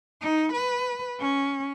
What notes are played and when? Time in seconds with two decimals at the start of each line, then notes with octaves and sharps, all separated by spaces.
0.22 D#4
0.53 B4
1.19 C#4